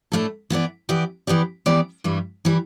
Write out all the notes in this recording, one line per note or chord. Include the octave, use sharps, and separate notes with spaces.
A2 A3 D4 A4
E3 B3 G4 D5
E3 B3 G4 D5
E3 B3 G4 D5
E3 B3 G4 D5
G2 E3 G3
E3 G3